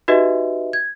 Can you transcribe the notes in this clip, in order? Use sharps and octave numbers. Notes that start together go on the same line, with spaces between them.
D#4 F#4 G4 B4 D#5 E5
G#6